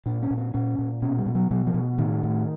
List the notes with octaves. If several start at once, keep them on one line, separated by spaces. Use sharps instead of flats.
A#2 D4
C#4
A#2
C4
A#2 C#4
A#2
B2 C#4
G3
B2
F#3
B2 F#3
F3
B2
A2 D#3
A2